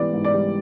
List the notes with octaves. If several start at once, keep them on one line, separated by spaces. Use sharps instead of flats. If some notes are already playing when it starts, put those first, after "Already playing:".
Already playing: G#2 E3 G3 B3 D5
G#2
D5
G3